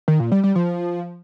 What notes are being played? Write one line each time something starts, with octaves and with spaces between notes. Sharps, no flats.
D#3
A#2
G3
G3
F3